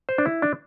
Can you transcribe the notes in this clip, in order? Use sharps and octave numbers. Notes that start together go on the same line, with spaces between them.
C5
D4
E4
D4